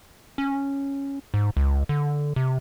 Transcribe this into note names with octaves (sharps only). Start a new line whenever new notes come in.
C#4
G#2
C#2
D3
C3